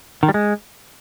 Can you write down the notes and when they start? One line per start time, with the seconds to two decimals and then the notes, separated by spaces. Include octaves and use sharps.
0.23 D#3
0.29 G3
0.34 G#3